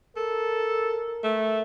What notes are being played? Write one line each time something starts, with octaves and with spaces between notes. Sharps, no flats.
A4 A#4
A3